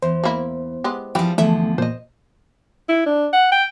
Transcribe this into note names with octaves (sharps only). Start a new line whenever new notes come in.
E2 C5
A#3 E4
G#3 B3 G4
E3 F3 G3 C4 G5
E2 D3 F3 A3 E5
A#2 C5 D#5
E4
D4
F#5
G5